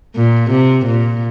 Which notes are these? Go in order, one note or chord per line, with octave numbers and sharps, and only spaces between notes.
A#2
C3
A#2